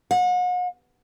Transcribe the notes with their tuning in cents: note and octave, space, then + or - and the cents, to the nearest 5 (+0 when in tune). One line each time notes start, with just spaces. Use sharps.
F#5 -40